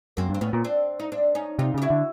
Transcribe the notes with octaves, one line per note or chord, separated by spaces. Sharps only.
F#2 A#3 C4
G2
C4
A2 B3 C#4
A#2
C4 D4
D#4
C4 D4
C#4 D#4
C3 D#4 F4
C#3 G4
E4 F#4
D3